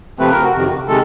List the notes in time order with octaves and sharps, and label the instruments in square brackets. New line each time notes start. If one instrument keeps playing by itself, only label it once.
[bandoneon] C3 F3 A3 C4 B4
A#4
F#4
F2 C3 D#3
C3 D#3 G#3 A4